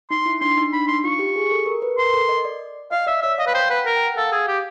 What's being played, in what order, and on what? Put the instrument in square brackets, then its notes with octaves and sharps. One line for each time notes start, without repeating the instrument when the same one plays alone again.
[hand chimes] D#4 [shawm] C6
[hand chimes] E4
[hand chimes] D4 [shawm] C6
[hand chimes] D#4
[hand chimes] D4 [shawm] B5
[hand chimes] D#4 [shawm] C6
[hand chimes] F4 [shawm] C#6
[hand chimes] G4
G#4
A4
A#4
B4
[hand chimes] A#4 [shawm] C6
[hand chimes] A4
D#5
D5
[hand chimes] D#5 [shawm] F5
[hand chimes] D5 [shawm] E5
[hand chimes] C#5 [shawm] E5
[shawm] D#5 [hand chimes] F5
[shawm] B4
[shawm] C5 [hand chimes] G5
[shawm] B4 [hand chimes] F#5
[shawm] A#4
[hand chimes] G5
F#5
[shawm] A4 [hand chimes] F5
[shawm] G#4
G4